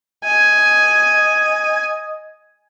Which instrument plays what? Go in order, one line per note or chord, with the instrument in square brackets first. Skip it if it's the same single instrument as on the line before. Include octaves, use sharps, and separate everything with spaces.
[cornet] D#5 [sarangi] G#5